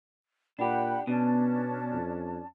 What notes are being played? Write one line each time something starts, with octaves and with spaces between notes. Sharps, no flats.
A#2 D4 G4 F#5 G5 B5
B2 B3 C#4 D4 A5
F2